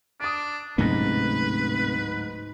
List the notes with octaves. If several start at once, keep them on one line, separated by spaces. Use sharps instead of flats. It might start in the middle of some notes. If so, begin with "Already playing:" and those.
D4 D#6 D7
D1 G#2 C3 A3 C#4 B4 A#6